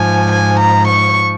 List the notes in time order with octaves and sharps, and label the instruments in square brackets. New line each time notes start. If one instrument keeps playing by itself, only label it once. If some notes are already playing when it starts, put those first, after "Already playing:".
Already playing: [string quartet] G#2 F3 G#5
G#5
A#5
C#6